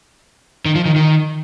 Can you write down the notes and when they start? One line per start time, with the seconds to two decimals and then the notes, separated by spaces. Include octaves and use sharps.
0.66 D#3
0.75 F3
0.86 D#3
0.96 D#3